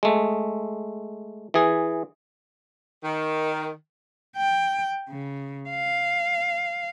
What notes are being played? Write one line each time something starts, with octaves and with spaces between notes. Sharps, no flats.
G#3 A3
E3 G#4
D#3
G5
C#3
F5